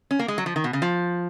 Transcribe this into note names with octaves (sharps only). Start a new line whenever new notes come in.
C#4
A#3
G#3
F#3
F3
D#3
B2
C#3
F3